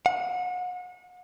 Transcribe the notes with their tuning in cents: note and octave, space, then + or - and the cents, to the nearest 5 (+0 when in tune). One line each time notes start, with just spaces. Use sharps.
F#5 -35